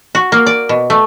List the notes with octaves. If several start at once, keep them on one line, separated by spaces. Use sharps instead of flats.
F#4
A#3
D5
B2
A3